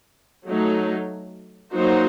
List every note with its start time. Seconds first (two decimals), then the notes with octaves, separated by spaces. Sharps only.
0.48 F#3 A3 D#4
1.73 F#3 A#3 D#4 F#4 C5